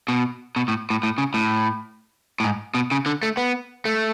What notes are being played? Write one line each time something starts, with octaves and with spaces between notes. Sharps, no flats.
B2
B2
A2
A2
A2
C#3
A2
A2
G#2
B2
C#3
D3
A3
B3
A3